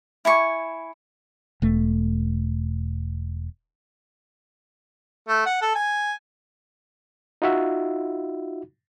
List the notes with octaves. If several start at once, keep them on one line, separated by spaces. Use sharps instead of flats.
E4 G#5 C#6
E1 A3
A3
F#5
A4
G#5
D#4 F4 F#4 E5